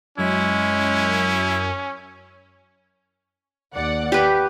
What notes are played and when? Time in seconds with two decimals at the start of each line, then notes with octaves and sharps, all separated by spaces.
0.18 F#2 G#3 C#4 E4
3.74 D#2 D5 F#5
4.12 G4 B4